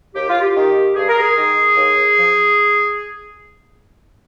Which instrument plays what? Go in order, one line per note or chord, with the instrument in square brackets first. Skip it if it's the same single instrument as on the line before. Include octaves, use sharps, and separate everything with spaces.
[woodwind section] D#2 G4
F4
G4
D#3
G2 G#4
A#4
G#4
D#3
D#2
F3